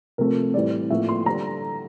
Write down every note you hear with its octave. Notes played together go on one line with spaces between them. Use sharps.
C3 F3 A3 C4 A#4
A2 E3 G3 C4 D5
A2 F3 A#3 E5
C6
D3 G3 A#5